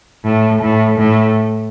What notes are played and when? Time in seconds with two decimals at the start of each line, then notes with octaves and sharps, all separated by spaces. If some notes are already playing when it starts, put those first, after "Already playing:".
0.24 A2
0.62 A2
0.98 A2